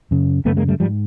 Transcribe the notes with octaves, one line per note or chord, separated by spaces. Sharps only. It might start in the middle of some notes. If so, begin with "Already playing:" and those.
F#2 C#3
F#2 C#3 A3 B3
G#3 A#3
G3 A3
G#2 F3 G3